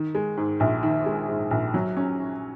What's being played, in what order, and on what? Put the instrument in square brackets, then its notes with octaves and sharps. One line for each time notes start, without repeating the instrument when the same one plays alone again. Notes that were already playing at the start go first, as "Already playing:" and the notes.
Already playing: [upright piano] D#3
G#3
G#2
A#1
D#3
G#3
G#2
A#1
F#3
C#4